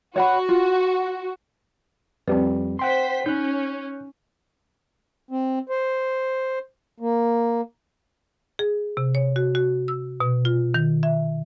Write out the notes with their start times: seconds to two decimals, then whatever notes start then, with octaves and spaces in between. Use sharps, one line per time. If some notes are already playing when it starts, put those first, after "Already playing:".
0.16 F#4 C#5 F#5 B5
0.49 F4
2.28 F2 G3 C4 B4
2.79 C5 F#5 G5 C6 B6
3.26 C#4 D#4 F#6 G6
5.31 C4
5.69 C5
7.00 A#3
8.59 G#4
8.97 C3
9.15 C#5
9.36 F#4
9.55 F#4
9.88 E6
10.20 B2
10.45 F4
10.74 D#3
11.03 E5